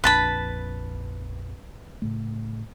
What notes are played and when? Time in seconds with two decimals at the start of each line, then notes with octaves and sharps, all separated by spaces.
0.04 A#1 F2 D4 B4 A5 B5
2.02 A2 C#3 A3